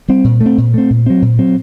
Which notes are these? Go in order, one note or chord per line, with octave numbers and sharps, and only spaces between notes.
G3 C4
A#2
A3
C4
A#2
A3 C4
A#2
F#3 C4
A#2
F#3 C4